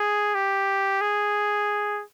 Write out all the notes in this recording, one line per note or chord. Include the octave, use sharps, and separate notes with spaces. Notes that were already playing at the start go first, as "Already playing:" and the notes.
Already playing: G#4
G4
G#4